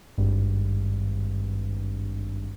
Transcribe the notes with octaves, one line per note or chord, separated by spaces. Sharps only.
G#1 G2